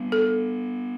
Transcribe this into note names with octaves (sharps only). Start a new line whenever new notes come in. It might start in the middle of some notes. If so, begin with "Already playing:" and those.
Already playing: G3 B3
A4